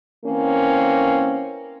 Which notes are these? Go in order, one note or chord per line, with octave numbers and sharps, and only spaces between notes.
E3 A#3 C4 C#4